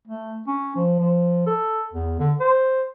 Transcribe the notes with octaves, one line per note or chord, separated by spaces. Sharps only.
A3
C#4
F3
F3
A4
E2
D3
C5